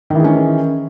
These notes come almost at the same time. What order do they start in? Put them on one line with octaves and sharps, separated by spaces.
D#3 E3 G#4 C#4